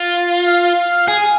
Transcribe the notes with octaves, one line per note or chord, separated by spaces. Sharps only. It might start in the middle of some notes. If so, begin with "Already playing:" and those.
Already playing: F4
F5
G#4 G#5